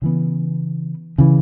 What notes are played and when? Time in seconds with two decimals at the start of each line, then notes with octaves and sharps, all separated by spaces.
0.02 C#3 E3 B3
1.18 C#3 E3